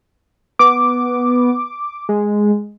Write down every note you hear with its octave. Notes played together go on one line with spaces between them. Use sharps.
B3 D6
G#3